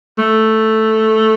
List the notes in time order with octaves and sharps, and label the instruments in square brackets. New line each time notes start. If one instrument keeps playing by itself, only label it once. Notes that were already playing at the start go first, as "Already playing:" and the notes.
[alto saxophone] A3